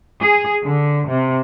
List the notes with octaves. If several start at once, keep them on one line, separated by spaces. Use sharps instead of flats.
G#4
D3
C3